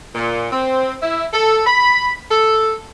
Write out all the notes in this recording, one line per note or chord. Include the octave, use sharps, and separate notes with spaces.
A#2
C4
E4
A4
B5
A4